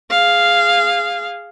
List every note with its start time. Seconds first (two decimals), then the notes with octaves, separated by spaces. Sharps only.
0.11 G#4 F5